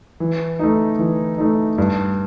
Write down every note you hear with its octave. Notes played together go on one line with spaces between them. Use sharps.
E3
A3 D#4
E3
A3 D#4
G2